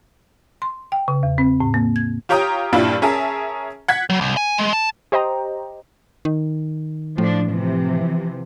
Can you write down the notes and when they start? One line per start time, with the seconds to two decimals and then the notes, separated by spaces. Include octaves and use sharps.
0.62 C6
0.92 G5
1.08 C#3
1.23 E2
1.38 C4
1.60 A2
1.74 A#3
1.96 G#6
2.29 F4 G4 C#5 G5 A#5 D#6
2.73 G2 A#2 G3 D4 E4 F4
3.02 C#4 G#4 A#4 E5 A5
3.88 F#5 G#6 B6
4.10 F#3
4.21 C2
4.37 G#5
4.58 G#3
4.73 A5
5.12 G4 C5 D#5 G5 A#5
6.25 D#3
7.18 A2 F3 D4
7.49 C3 E3 F3